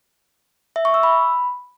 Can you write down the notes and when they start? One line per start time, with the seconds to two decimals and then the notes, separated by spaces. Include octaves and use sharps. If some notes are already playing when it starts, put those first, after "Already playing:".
0.76 E5
0.85 C#6
0.94 E6
1.03 B5